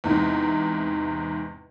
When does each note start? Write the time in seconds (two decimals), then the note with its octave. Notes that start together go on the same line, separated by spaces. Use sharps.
0.04 E2 G#2 C3